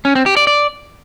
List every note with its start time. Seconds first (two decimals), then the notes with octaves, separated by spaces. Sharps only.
0.05 C#4
0.15 C4
0.26 G4
0.37 D5
0.47 D5